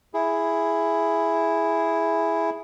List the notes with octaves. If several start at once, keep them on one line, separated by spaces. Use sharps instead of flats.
E4 G#4